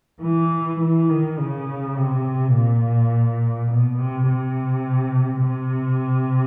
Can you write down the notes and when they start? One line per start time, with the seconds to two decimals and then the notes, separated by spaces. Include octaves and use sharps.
0.21 E3
0.80 E3
1.09 D#3
1.38 C#3
1.96 C3
2.54 A#2
3.72 B2
4.00 C3
4.29 C3
5.45 C3